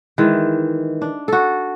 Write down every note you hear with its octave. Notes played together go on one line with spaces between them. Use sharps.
D#3 E3 G#3
D4
F#4 A4